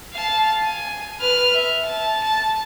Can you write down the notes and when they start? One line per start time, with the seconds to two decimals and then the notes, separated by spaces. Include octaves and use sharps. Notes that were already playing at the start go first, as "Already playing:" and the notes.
0.12 F5 A5
0.63 G#5
1.19 B4 F6
1.54 E5
1.85 A5
2.23 A5